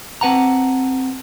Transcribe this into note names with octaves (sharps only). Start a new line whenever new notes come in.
C4 B4 F#5 A5 A#5